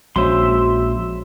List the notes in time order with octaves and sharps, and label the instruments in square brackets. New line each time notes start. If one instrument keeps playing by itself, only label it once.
[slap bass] A#1 [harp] G#3 C#4 C5 [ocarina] F#4 [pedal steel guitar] E5 C6